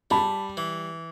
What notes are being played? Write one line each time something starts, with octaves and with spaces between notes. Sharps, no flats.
G3 A5 B5
E3